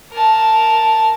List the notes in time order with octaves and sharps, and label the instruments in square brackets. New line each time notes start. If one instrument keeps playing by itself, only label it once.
[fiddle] A#4 A5